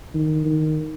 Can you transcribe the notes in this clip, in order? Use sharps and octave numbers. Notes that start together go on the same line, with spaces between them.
D#3
D#3